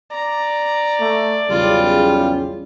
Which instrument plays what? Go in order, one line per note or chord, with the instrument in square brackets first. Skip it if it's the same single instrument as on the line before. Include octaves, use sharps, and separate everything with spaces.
[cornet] D5 [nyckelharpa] A#5
[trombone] A3
[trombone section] B1 E2 C#3 [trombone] G3 [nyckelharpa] F4